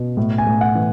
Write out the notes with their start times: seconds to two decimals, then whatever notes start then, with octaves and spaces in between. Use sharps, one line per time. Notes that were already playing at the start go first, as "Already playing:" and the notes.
Already playing: B2
0.17 A2
0.38 G#5
0.46 A2
0.61 F#5
0.75 E3